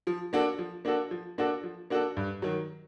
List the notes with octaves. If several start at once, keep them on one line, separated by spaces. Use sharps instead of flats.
F3
A#3 D4 F#4 A4
F3
A#3 D4 F#4 A4
F3
A#3 D4 F#4 A4
F3
A#3 D4 F#4 A4
G2
D#3 F#3